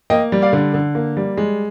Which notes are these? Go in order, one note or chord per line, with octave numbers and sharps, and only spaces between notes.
A#3 D#5 G5
G3
D5 F5
D3
D3
A#3
G3
G#3